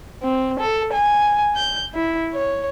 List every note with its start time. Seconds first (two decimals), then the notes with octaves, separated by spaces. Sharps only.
0.22 C4
0.59 A4
0.92 G#5
1.55 G6
1.94 E4
2.33 C#5